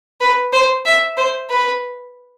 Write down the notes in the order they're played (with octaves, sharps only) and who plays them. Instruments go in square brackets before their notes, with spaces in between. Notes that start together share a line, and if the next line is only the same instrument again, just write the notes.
[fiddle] B4
C5
E5
C5
B4